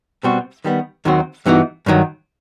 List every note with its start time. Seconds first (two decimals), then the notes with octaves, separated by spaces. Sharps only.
0.23 B2 G3 C4 F#4
0.64 D#3 G3 B3
1.05 D#2 D#3 F#3 C4 F#4
1.46 G2 E3 B3 D#4 F#4
1.86 G2 D#3 F#3